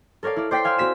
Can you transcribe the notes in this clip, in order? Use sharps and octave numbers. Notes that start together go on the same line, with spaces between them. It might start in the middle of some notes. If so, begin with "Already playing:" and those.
A4 A#4 C#5 D5 F5
E4 D5
C5 D5 G5 G6 B6 C7
F5 G#5 C6 E6 F6
C4 F#4 B6 E7